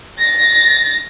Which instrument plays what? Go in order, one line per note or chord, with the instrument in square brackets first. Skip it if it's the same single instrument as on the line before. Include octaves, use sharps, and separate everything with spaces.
[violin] A6 A#6